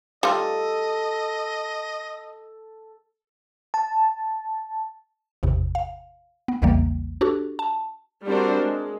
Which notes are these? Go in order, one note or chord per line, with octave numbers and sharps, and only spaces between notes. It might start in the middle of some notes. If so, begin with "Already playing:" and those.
G3 D#4 F4 A4 D#5
A5
G#1 E2 C3
F5
B3
A#1 E2 C#3 E3 G3 A#3
D4 F#4 G4 A4
A5
G3 C4 D4 F#4 A#4 C5
G#3